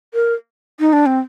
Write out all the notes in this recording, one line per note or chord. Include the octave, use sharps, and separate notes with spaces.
A#4
D#4
D4
C4